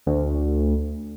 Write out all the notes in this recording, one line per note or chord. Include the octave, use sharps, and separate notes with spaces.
D2